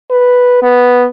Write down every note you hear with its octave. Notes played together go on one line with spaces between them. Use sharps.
B4
B3